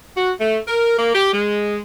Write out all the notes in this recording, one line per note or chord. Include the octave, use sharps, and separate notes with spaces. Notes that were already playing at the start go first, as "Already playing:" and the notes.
F#4
A3
A#4
A#3
G4
G#3